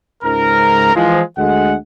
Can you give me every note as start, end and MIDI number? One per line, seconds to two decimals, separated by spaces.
0.24 0.92 37
0.24 0.92 44
0.24 0.92 70
0.24 0.92 82
0.95 1.21 52
0.95 1.21 53
0.95 1.21 56
1.38 1.75 38
1.38 1.75 56
1.38 1.75 78